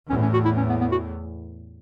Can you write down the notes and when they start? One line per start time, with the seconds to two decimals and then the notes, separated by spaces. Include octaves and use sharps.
0.10 E2 A2 C#4
0.22 C#4
0.33 F#4
0.45 E4
0.57 C#4
0.70 B3
0.81 B3
0.92 F#4